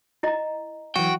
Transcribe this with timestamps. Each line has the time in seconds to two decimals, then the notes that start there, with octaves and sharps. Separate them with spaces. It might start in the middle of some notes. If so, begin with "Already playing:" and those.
0.23 E4 D#5 A#5
0.96 E3 F#3 F#4 G5